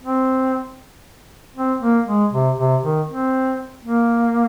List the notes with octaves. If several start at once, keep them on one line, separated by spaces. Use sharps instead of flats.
C4
C4
A#3
G#3
C3
C3
D#3
C4
A#3